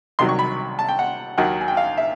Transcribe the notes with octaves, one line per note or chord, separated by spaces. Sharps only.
C2 C3 D#3 F#3 C6
C#6
B5
A5
G5
F#5
D#2 D#3 F#3 F#5
G#5
G5
F5
E5